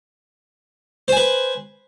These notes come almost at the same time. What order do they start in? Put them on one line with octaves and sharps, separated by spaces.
C5 G#5 B4